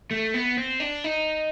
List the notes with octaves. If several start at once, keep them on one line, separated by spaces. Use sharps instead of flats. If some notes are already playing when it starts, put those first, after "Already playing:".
A3
B3
C4
D4
D#4